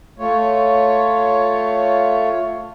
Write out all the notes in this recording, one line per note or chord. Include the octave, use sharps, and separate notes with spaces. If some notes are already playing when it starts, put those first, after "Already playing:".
A3 F4 C#5